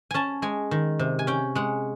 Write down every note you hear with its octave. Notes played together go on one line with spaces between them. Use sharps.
C#4 G#5 A5
G#3 G#5
D#3
C3
G#5
C#4 G5
G#3 F#5